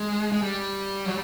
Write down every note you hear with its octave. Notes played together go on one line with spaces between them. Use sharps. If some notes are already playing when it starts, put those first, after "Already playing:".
Already playing: G#3
G#3
G3
F#3